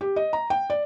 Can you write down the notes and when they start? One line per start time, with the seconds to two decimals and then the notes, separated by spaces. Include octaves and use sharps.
0.01 G4
0.16 D#5
0.33 A#5
0.50 G5
0.70 D5